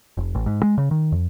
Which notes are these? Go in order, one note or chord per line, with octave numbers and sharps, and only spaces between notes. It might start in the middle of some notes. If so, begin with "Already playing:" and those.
F1
A1
G#2
G#3
C#3
D#3
F2